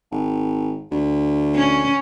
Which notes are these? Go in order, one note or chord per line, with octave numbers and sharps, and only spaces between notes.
G#1
D2
C#4